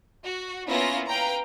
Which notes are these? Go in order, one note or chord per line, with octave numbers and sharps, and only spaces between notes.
F#4
A#3 B3 C#4 E4 F4 A#6
B4 F5 G5 A#5